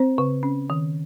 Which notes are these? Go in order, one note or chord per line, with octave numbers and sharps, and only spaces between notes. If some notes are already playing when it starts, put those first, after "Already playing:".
Already playing: C4 C5
C#3
C#4
D#3